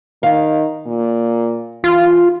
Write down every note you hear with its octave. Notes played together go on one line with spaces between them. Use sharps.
D#3 F5
A#2
E3 F4